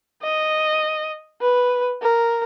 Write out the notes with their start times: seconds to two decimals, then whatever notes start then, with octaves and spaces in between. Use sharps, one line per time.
0.23 D#5
1.42 B4
2.02 A#4